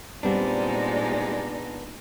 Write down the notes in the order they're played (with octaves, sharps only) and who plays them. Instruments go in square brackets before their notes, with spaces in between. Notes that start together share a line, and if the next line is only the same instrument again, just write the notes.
[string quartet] A#2 G#3 D#4 [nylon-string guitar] G3 C4 [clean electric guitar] B3 D4 [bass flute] D5